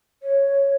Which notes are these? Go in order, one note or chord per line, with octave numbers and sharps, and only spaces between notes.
C#5